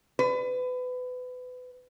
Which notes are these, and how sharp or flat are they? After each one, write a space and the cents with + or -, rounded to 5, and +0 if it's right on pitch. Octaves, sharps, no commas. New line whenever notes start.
B4 +25